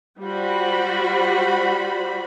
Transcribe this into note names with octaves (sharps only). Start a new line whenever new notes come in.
G3 F4 F#4 C5 B5